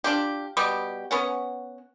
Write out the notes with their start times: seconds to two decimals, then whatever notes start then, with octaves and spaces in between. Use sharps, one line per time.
0.04 D4 F4 G4
0.57 B2 G3 B3 G4
1.11 B3 C#4 F#5